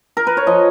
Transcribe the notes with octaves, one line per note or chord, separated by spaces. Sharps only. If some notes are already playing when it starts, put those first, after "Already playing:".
A#4
B4
C#5
F3 D#5